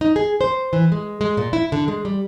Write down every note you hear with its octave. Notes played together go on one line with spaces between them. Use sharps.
D#4
G#4
C5
E3
G#3
G#3
A#2
E4
D3
G#3
G3